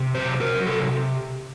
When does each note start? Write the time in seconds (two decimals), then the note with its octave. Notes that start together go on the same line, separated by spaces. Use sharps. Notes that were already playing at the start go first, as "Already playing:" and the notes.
Already playing: C3
0.15 F#3 C5
0.40 F#3 A#4
0.66 C3 A4